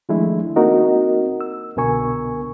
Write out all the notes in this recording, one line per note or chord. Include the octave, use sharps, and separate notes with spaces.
D#3 F3 G#3 A3 D4 E4
A#3 C4 D#4 F#4 A#4 D#5
E6
C2 B2 D3 A#4 G#5 C#6